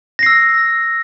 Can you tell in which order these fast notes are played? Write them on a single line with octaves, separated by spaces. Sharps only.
A#6 C7 E6